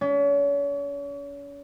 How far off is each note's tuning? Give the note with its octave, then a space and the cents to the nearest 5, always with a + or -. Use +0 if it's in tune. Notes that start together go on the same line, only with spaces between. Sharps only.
C#4 +40